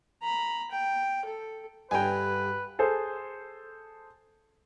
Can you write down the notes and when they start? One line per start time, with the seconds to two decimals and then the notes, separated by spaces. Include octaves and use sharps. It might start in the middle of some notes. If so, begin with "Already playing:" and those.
0.22 A#5 B5
0.71 G5
1.26 A4
1.91 G2 D3 G4 B4 G5 G#5 A#5
2.79 G#4 A4 C5